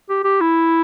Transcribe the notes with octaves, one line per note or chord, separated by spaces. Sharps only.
G4
G4
E4